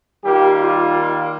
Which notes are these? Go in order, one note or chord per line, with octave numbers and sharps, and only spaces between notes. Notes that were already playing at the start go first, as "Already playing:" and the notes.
D#3 G3 A#3 F4 G4
F4